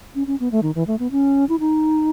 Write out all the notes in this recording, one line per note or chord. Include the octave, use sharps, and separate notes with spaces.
C#4
C#4
B3
A3
D#3
E3
A3
B3
C#4
E4
D#4